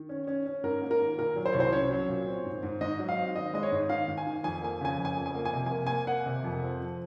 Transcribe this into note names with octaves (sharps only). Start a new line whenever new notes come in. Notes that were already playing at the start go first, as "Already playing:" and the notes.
Already playing: D#3
C#4
C#4
C#4
G#2 A#4
A#3
A#4
D#3
A#2 A#4
F#3
C5
C2 C#5
C5
C#4 C#5
F#3
A#2
C4
G#2
G#2
G#2 D#5
F#3
F5
C4
D#3 D#5
G#3 D#5
C#5
G#2
D#3 F5
G#2
G#5
D#3
F2 G#5
A#3 G#5
C#3 G#5
F2
G#5
F2
G#5
A#3
G#5
C3
A#3 G#5
A#3 G#5
A#3 F#5
C3
F2
C4
F3